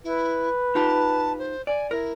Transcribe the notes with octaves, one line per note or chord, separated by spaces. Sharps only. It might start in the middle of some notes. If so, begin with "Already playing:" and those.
E4 B4
D#4 F4 G4 A5
C5
D5 G#5
E4 A#4